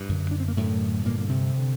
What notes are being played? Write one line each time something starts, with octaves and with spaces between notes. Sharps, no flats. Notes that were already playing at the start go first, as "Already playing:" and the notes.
Already playing: G2 G3
F#2 D3
D4
C4
A#3
F#2 A2 D3 A3
G2 A#2 D3 A#3
A#3
C3 C4
D3